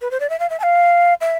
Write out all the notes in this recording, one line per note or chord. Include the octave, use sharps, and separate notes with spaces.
B4
C5
D5
E5
F5
E5
A5
F5
E5